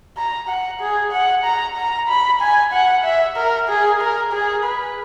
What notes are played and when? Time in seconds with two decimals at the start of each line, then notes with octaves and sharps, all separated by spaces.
0.18 A#5
0.49 F#5
0.81 G#4
1.13 F#5
1.45 A#5
1.77 A#5
2.08 B5
2.41 G#5
2.73 F#5
3.04 E5
3.37 A#4
3.69 G#4
4.01 A#4
4.33 G#4
4.64 B4